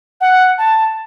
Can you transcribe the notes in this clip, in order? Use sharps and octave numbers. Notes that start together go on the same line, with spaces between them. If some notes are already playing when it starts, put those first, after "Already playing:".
F#5
A5